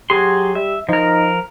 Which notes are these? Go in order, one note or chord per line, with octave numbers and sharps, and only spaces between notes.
F#3 G4 G#4 C6
G3 E5
F3 D#4 A#4